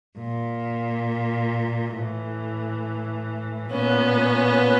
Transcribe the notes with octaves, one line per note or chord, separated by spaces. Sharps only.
A#2
A2 E3
A#2 B3 C#4